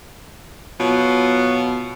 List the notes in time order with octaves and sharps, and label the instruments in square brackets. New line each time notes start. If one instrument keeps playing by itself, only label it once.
[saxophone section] B2 F#3 F4